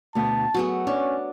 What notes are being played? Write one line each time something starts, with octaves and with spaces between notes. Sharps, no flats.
D2 B2 B3 A5
F#3 A3 B3 F#4 G#4
C#4 D4 C#5